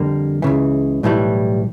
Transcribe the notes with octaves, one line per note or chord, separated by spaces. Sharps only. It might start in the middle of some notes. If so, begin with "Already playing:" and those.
Already playing: F2 D3 G3 A#3
C#2 C#3 E3
B1 A2 E3 G3